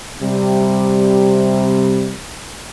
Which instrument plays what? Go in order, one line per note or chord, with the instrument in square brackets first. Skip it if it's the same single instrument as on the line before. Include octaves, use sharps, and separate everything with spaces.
[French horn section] C3 G3